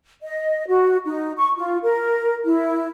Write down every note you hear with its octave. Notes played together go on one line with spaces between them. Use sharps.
D#5
F#4
D#4
C#6
F4
A#4
E4